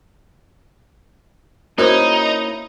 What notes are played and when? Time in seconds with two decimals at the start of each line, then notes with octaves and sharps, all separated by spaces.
1.78 A#3 C#4 D#4 E4 F#4 A#4 C5